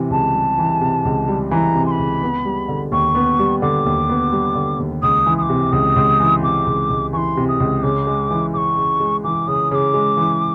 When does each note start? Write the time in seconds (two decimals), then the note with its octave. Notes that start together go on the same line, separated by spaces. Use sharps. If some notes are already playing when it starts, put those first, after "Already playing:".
Already playing: C3 E3
0.10 C#2 A5
0.34 G3
0.58 E3
0.81 C3
1.05 C#2
1.28 G3
1.51 E3 A#5 B5
1.75 C3
1.86 C6
1.91 B5
1.99 C#2
2.21 B3
2.45 G3
2.68 D3
2.92 D#2 C#6
3.15 B3
3.39 G3
3.62 D3 D6
3.86 D#2
4.09 B3
4.32 G3
4.55 D3
4.79 D#2
5.02 C#2 D#6
5.26 E3
5.38 D#6
5.43 D6
5.50 C3
5.72 C#2 D#6
5.96 C#2
6.20 E3
6.42 C3 D6
6.67 C#2
6.90 C#2
7.13 E3 C6 C#6
7.37 C3
7.48 D#6
7.60 C#2
7.83 C#3 D6
8.07 G#3
8.31 E3
8.54 C#3 C#6 D6
8.77 C#3
9.00 G#3
9.24 E3 D6
9.48 C#3 D#6
9.71 C#3 D6 D#6
9.94 G#3
10.17 E3